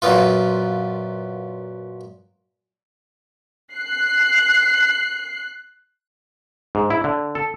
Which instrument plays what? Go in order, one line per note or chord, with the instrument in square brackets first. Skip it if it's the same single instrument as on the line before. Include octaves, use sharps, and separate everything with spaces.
[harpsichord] F#2 A#2 B3 F4
[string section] F#6 C7
[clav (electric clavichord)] G#2
E4
D3
A4